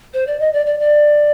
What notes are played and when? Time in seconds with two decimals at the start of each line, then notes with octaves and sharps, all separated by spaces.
0.14 C5
0.27 D5
0.40 D#5
0.53 D5
0.66 D5
0.80 D5